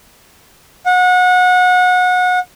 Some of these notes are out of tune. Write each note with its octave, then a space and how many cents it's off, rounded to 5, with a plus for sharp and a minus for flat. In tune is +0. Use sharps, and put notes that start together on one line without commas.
F#5 -25